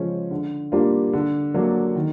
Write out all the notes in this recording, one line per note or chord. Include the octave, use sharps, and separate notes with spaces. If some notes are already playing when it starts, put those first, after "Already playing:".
Already playing: C#3 F3 G#3 C#4
D3
G3 A#3 D4 F4
D3
F#3 A#3 D4
D#3